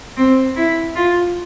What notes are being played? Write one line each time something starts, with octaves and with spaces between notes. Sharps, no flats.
C4
E4
F4